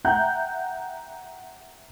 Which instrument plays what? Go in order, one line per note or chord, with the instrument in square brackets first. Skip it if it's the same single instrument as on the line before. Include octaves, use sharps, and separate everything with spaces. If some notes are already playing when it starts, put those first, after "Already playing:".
[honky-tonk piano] E5 F#5 G5 A#5 F#6 G6